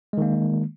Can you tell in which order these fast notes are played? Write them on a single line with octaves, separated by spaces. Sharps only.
G#3 D#3 A#3